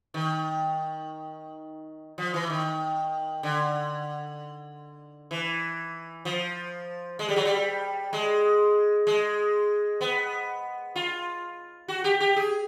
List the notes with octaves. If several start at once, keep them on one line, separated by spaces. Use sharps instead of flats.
D#3
F3
E3
D#3
D3
E3
F3
G#3
G3
F#3
G3
G#3
G#3
B3
F4
F#4
G4
G4
G#4